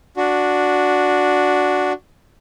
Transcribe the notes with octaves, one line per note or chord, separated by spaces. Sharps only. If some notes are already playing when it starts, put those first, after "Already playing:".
D4 F#4